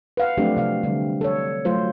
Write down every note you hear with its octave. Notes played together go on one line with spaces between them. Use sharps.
B4 F5 F#5
F3 F#3 A3 C4 D4 G4
C3 F5
D3 G3
A4 C#5
F#3 A3 F4 C5